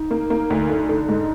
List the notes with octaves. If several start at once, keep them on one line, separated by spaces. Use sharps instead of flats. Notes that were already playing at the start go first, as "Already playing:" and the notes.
Already playing: D#4
A#3
A#3
D2
D3
D3
G#2